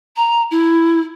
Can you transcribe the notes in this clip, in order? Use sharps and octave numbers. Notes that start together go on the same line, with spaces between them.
A#5
E4